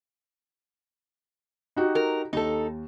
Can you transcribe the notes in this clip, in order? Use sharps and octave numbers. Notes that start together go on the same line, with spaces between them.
D#4 F#4 G4
A#4
D#2 D#4 A4